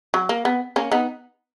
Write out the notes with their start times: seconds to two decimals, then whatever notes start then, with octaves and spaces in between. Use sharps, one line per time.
0.14 F#3
0.29 A#3
0.45 B3
0.76 A#3 C#4
0.92 B3 D#4